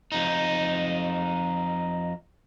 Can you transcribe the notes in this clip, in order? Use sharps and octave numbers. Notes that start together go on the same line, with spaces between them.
F2 D#4